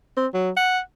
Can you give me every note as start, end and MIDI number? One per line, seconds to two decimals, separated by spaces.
0.17 0.27 60
0.34 0.51 54
0.57 0.80 78